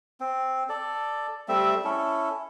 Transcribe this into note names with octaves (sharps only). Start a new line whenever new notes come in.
C4
A4 D5
G3 A3 C4 E5
C#4 E4 A4